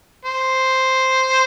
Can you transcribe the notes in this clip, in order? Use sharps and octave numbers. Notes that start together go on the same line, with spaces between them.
C5